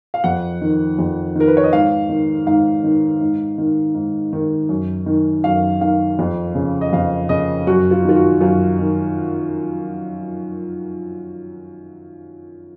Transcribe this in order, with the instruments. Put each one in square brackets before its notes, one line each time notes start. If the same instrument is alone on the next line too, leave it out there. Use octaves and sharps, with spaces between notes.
[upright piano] F5
F2 F#5
D#3
F2
D#3 A#4
B4
C#5
D#5
G#2 F5
D#3
G#2 F5
D#3
G#2
D#3
G#2
D#3
F#2
D#3
F#2 F5
D#3 F5
F2
C#3
D#5
F2 F5
C#3 D#5
F#2 F#4
F4
D#3 F4
F#4
F#2 F4
D#3